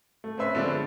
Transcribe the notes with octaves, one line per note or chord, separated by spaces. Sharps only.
A3
C4 C#4 B4 E5 C6
D3 F3 G#3 B3 D4